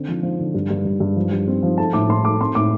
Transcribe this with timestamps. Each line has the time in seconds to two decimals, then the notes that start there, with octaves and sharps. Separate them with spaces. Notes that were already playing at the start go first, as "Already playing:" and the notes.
Already playing: D3 C4
0.08 F3
0.23 F3
0.39 D3
0.54 G2
0.70 G2
0.85 G2
1.00 G2
1.16 F3
1.32 G2
1.48 C4
1.63 F3
1.78 A3 A5
1.93 A2 D6
2.09 A2 C6
2.25 A3 D6
2.40 C4 C6
2.55 A2 D6